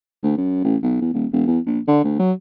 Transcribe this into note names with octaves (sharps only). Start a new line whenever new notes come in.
D2
F#2
A1
B1
E2
D#1
E1
E2
A#1
D3
D2
F#3